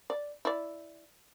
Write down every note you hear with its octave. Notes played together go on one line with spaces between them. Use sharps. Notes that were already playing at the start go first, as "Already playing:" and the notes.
D5
E4 D5